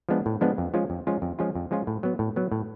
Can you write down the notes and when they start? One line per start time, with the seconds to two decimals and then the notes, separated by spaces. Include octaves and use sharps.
0.09 F3 G#3 B3 D4
0.26 A2
0.41 F3 G#3 B3 D4
0.58 F2
0.74 F3 G#3 C#4 F4
0.90 F2
1.07 F3 G#3 C#4 F4
1.22 F2
1.39 F3 G#3 C#4 F4
1.55 F2
1.71 F3 G#3 C#4 F4
1.87 A2
2.03 F#3 B3
2.19 A2
2.36 F#3 B3
2.52 A2